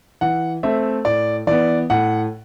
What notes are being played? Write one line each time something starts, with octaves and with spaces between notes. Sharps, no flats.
E3 F#5
A3 C4 E5
A2 D5
E3 B3 D5
A2 F#5